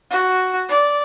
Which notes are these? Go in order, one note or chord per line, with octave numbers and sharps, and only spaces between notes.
F#4
D5